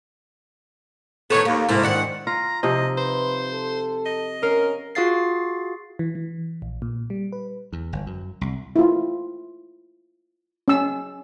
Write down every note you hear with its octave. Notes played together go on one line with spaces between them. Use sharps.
A2 D#3 B3 A4 C#5
D#2 A#3
G#2 C3 D#3 A3 A#3 E4
G#2 D#3 D4 F#5
F4 A#5
C3 F3 D#4 D#5
B4 C5
A4
D#5
C#4 A#4 F5
F4 F#4 G#4 F5 A6 C7
E3
E3
A#1
A#2
G3
B4
E2
G1
F#2
C2
E4 F4
C#4 E6